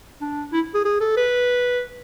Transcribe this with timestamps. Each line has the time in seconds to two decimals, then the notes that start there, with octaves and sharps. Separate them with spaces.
0.21 D4
0.52 E4
0.74 G#4
0.85 G#4
1.01 A4
1.17 B4